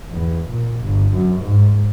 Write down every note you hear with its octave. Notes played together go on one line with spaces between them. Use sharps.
E2
A#2
G1
F#2
G#2